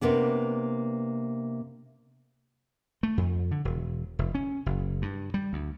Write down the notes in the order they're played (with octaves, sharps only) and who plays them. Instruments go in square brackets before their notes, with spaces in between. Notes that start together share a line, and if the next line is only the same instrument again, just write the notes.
[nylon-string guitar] C3 A#3 B3 D4
[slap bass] A3
F2
D3
E1
F1
C#4
F#1
G2
G3
D2